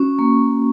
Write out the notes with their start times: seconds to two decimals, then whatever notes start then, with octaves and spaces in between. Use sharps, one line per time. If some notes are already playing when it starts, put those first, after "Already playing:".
Already playing: C#4 F#4 C#6
0.19 A#3